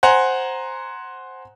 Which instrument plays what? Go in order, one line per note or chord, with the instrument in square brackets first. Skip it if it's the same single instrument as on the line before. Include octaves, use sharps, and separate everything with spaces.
[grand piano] C5 F#5 G#5 A#5